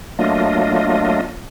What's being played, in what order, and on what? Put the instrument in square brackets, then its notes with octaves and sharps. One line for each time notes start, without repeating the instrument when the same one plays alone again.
[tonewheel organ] F#3 A3 A#3 D4 F4 D#5